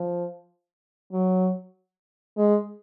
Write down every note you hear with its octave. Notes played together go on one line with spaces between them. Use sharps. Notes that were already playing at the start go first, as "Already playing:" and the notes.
Already playing: F3
F#3
G#3